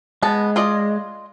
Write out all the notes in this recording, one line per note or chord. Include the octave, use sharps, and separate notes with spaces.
G#3 B3 A5
F4 D5 D#5